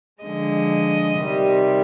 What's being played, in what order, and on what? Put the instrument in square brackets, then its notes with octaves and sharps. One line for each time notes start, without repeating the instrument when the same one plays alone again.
[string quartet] D3 F3 G#3 D#5
C3 D#3 G3